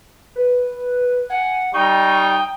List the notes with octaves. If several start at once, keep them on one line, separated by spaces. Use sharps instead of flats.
B4
F#5 G#5
G3 D#4 G5 C#6